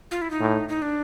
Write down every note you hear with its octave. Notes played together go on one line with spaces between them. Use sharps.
F4
E4
D#4
A2
D#4
D4